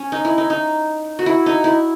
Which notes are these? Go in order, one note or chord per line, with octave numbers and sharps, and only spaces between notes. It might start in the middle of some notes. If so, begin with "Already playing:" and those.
Already playing: C#4
D#4
E4
D#4
D#4
F#4
E4
D#4
E4